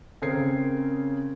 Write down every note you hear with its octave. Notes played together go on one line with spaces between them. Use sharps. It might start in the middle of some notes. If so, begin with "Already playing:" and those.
C#3 C4 G#4 A#4 G#6 C7